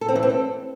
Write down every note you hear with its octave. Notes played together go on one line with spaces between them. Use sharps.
A4
C4
E3
C4
A4